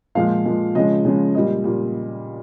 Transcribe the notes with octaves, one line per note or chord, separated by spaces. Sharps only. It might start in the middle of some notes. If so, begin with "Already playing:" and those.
A#2 F3 G#3 F5
A#2 F3 G#3
C#3 F3 G#3 D#5
C#3 F3 G#3
A#2 G3 D#5
A#2 G3